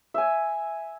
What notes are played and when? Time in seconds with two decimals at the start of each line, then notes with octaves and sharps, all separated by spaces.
0.14 E5 G#5